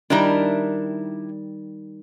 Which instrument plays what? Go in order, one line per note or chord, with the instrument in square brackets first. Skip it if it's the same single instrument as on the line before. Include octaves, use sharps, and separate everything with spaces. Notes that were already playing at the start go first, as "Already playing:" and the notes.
[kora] D#3 G3 [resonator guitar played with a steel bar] D4 E4 A#4